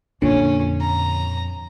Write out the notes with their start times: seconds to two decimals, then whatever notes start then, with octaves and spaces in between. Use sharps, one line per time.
0.22 F2 A#2 D3 C#4
0.81 A#5